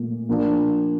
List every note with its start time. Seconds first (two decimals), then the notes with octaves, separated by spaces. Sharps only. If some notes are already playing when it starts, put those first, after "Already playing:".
Already playing: A#2 A3
0.28 F3 A#3 D4